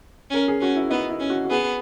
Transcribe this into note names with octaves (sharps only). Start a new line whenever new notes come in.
C#4 A#4
G#4
C#4 F#4
E4
B3 D#4
E4
C#4
F#4
F#4
B3 G#4